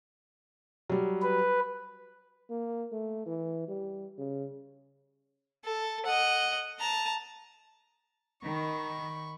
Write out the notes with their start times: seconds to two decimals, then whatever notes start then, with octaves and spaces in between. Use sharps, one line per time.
0.89 F#3 G3
1.22 B4
2.50 A#3
2.92 A3
3.26 E3
3.68 G3
4.18 C#3
5.65 A4
6.06 D#5 F#5
6.79 A5 A#5
8.43 D#3 B5 C#6